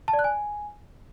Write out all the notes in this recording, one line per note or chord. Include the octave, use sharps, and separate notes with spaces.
A5
D5
F#6
G#5